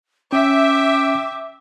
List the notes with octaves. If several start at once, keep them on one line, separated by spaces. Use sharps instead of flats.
C#4 E5 G5 D6